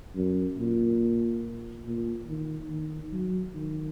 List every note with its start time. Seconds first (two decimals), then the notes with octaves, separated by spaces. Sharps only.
0.16 F#2
0.58 A#2
1.85 A#2
2.28 D#3
2.70 D#3
3.13 F#3
3.55 D#3